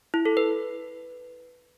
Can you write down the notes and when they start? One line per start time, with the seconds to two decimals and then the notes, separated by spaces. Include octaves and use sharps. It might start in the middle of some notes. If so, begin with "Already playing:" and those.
0.14 E4
0.25 A4
0.37 B4